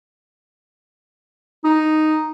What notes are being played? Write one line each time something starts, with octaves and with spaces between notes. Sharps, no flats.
D#4